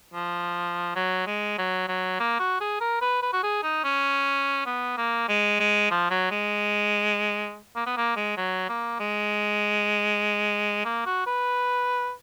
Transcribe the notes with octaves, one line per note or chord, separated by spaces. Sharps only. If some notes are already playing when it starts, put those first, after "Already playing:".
F3
F#3
G#3
F#3
F#3
A#3
F#4
G#4
A#4
B4
B4
F#4
G#4
D#4
C#4
B3
A#3
G#3
G#3
F3
F#3
G#3
A#3
B3
A#3
G#3
F#3
A#3
G#3
A#3
F#4
B4